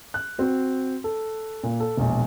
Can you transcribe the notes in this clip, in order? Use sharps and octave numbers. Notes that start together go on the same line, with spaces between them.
F#6
C4 F#4
A4
A#2
A4
E1 A#1